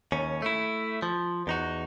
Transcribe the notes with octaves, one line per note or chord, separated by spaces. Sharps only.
D#2 C#4
A3 E4
F3
E2 D#4 F#4